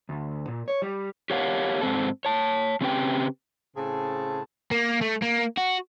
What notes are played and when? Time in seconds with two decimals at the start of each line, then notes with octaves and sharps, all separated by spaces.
0.09 D2
0.48 A#2
0.68 C#5
0.82 G3
1.30 G4 A#4 C#5 F5 F#5
1.81 G#2 C4 A4
2.25 C#5 A5
2.81 C#3 C4 C#4 G4 B4 G5
3.76 A2 C#3 C4 G#4 A5
4.71 A#3
5.02 A3
5.22 A#3
5.58 F#4